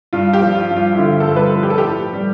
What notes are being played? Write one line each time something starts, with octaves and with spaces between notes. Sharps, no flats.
G2 F4
G4
F3
F4
G2
F4
E4
D3 F4
A4
G2
B4
A4
F3
G4
A4
G4
A2
G3